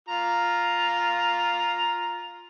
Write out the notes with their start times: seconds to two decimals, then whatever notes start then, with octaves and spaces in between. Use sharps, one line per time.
0.08 F4 A#5